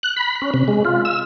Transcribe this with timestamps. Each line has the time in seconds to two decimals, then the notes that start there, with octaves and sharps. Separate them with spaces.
0.03 F#6
0.17 B5
0.42 C#4
0.54 C3
0.68 G#3
0.85 F4
1.05 E6